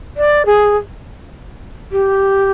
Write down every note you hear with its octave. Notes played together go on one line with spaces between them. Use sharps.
D5
G#4
G4